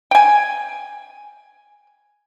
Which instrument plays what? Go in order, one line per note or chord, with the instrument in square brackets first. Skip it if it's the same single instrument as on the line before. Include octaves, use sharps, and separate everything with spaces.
[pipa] G5 G#5